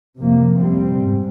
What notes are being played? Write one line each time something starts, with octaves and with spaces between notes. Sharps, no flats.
F2 C3 F3 A#3
C3 G3 C4
G#2